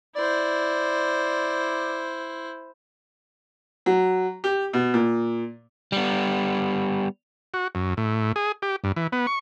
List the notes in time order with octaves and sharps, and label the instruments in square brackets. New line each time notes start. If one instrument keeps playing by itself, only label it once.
[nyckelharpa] E4 C5 [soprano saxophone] D5
[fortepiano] F#3
G4
B2
A#2
[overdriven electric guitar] G3 B3
[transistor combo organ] F#4
F#2
A2
G#4
G4
G2
E3
B3
C#6